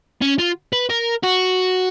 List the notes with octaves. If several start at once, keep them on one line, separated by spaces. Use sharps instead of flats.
C#4
F4
B4
A#4
F#4